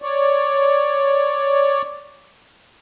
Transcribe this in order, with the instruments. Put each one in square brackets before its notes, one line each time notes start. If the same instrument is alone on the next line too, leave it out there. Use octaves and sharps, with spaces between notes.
[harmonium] C#5 D5